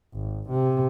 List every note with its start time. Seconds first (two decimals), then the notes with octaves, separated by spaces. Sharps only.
0.14 G#1
0.49 C3